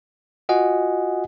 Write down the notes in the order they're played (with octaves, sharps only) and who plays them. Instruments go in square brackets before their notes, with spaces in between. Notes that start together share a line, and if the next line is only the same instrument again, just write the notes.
[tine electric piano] F4 F#4 D#5 F#5 G#5